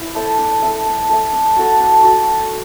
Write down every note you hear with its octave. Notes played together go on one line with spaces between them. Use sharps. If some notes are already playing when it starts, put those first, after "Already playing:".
Already playing: E4
A4 C5 E5
D4
A4 E5
D4
A4 E5
D4
F#4 A4
D4
F#4 A4